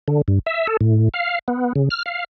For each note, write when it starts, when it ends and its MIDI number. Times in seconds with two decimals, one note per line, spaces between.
0.08 0.22 50
0.28 0.39 43
0.46 0.67 76
0.67 0.77 69
0.81 1.09 45
1.14 1.39 77
1.48 1.73 59
1.76 1.89 49
1.90 2.03 89
2.06 2.24 77